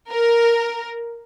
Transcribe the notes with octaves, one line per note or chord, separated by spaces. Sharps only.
A#4